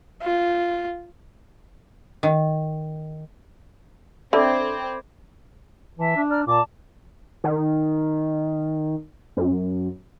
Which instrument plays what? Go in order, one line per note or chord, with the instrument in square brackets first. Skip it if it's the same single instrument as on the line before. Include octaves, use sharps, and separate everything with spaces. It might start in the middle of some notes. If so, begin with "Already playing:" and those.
[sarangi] F4
[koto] D#3
[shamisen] D3 [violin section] C4 [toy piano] A4 D5 E5 [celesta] B5 D6 G#6
[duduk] E3 [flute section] E5 A5
[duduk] D4
[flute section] D5 A#5 F6
[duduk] A#2 [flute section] D5 A5 D6
[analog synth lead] D#3
F#2